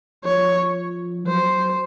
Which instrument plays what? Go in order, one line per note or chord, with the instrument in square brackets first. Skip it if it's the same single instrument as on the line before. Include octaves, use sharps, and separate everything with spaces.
[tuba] F3 [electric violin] C#5
[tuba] F#3 [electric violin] C5